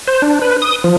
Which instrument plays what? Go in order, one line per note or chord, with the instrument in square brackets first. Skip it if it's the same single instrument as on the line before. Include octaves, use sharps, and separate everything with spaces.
[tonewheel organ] C5
D4
B4
D#6
F3